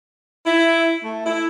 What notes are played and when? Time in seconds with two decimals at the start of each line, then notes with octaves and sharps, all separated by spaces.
0.46 E4
1.03 A3
1.26 E4